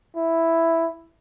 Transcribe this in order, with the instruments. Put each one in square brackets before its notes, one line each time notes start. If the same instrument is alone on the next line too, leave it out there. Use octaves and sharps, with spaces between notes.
[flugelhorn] E4